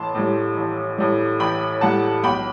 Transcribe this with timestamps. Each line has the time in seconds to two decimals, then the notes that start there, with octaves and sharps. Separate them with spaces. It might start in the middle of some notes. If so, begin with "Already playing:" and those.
Already playing: A1 A2 A5 B5 C6
0.15 A2 G3
0.57 A1
0.98 A2 G3
1.40 A1 G5 B5
1.81 A2 G3 F#5 A5
2.24 B1 G5 B5